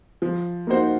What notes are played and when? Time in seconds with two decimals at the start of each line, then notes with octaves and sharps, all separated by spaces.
0.22 F3
0.67 A#3 D#4 F#4 C5